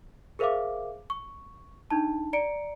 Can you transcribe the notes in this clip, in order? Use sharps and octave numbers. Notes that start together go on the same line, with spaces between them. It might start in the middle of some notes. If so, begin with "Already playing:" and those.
G#4 A#4 C5 E5 F5 D6
C#6
D4 D#4 A5
D5 A#5 C#7 D7